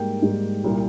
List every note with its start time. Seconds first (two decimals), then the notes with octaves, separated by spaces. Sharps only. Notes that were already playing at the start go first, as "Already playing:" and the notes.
Already playing: G#2 G3 A#3 G5
0.22 G#2 G3 A#3
0.64 C2 A#2 G3 A#3